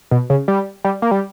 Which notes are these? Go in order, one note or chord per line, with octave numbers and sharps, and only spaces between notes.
B2
C#3
G3
G3
A#3
G3